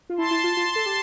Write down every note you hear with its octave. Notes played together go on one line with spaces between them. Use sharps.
F4
E4 A5 C6
E4
F4
F4
A4
G4